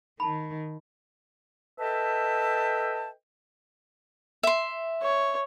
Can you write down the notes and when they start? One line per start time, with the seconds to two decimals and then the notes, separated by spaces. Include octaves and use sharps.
0.20 D#3 A5 B5
1.78 A4 B4 D#5 E5 G5 A5
4.43 E5 C6
5.02 C#5